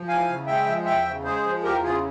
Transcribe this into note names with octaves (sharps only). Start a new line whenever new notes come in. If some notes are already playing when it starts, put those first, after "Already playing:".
Already playing: F3
E2 F5 G#5
C#3
G#3 E5 G5
F3
E2 E5 G5
C#3
G#3 G#4 C5
F3
E2 G4 A#4
C#3 F4 G#4